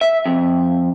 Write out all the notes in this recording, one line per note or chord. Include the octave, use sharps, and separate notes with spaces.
E5
F2